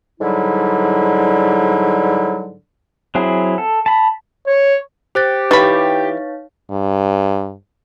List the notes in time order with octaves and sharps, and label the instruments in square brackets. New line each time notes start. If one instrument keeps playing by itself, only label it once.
[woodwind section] G#2 D3 F#3 G3 E4
[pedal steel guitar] F#3 C4 E4 G#4
A4
A5 B5
[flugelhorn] C#5
[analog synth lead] G4 [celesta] C5 F#6 A6 [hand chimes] G5
[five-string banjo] E3 B5 [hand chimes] D#4 C#5 F5 [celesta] B4 C#6 A6
[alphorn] G2